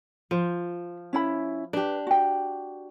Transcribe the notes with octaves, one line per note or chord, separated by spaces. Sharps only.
F3 C5
C#4 E4 B5
D4 G4 B4
F#4 G5